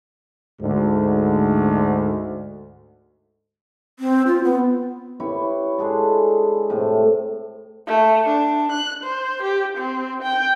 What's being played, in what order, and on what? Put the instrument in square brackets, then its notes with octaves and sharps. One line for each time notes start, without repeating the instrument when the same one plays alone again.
[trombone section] D2 G#2
[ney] C4
F4
B3
[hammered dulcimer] E4 G4 B4 C#5
G#3 D4 G#4 A4
A2 C3 A3
[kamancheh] A3
D4
F#6
C5
G4
C4
G5